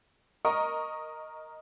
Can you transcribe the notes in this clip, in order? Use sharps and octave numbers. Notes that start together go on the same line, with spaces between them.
A#4 D#5 C#6